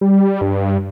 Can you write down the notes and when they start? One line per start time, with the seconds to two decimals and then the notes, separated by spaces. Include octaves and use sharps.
0.01 G3
0.41 G2